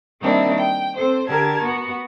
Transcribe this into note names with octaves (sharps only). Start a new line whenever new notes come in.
D#3 G3 A#3 C4 D4 E4
G5
C4 A4 C5
D3 G4 A#4 A5 G#6
B3 F#4